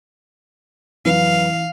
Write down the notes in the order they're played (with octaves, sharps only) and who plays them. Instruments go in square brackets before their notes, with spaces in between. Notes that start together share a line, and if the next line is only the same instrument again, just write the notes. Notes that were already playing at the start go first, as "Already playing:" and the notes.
[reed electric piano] F2 F#3 B4 [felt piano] E3 [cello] F5